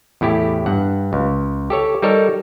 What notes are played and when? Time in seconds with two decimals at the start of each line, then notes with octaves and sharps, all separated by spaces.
0.21 E2 A2 E4 G4
0.66 G2 F#5
1.13 C#2
1.70 G4 A4 C#5
2.02 G3 D#4 A4 A#4 C#5